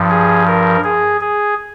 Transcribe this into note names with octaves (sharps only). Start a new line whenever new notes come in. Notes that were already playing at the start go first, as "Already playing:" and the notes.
Already playing: G2 F3
G#4
A#4
G#4
G#4